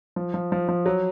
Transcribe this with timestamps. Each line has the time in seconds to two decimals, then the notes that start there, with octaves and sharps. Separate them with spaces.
0.16 F3
0.34 F3
0.52 F3
0.69 F3
0.86 F#3